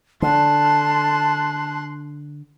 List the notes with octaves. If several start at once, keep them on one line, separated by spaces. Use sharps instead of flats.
D3 A5 C6 F#6